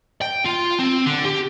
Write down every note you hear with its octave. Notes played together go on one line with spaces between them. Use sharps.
G5
F4
C4
D3
G4